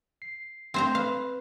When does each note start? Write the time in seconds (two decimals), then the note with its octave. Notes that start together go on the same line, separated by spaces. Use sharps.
0.22 C7
0.74 A3 C4 C5 A#5
0.95 B4 F5